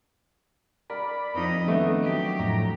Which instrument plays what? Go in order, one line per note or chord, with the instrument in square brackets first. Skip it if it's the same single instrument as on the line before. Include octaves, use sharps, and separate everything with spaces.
[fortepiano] A#4 [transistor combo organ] D5 B5
[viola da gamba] F2 D#4 D#5
[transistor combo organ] D#3 D#5 [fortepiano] A3 B3 [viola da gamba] D4
[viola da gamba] F#3 G4
[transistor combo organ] F2 A2 A#5